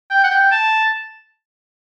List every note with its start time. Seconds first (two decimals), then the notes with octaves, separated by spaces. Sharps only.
0.10 G5
0.24 F#5
0.31 G5
0.51 A5